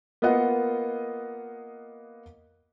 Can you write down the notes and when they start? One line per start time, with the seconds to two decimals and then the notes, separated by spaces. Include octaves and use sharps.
0.22 A#3 B3 F4 D#5 F#5